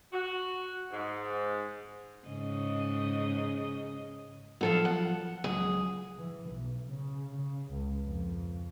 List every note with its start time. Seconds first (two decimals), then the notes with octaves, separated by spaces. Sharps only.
0.13 F#4
0.92 G#2
2.28 G#2 C#3 D#5
4.61 F3 F#3 B3 A4 F5
4.85 F#5
5.44 C#2 F#3 G#4
6.18 E3
6.50 B1
6.89 C#3
7.35 C#3
7.72 C#2
8.05 F2